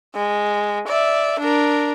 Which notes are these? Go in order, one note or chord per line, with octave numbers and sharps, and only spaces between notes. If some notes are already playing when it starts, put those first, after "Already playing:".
G#3
D5 E5
D4 A#4